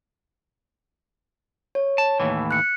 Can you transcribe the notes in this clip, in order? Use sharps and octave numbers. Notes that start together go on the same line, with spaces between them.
C#5
A5
D#2 A2 E3
F#6 C#7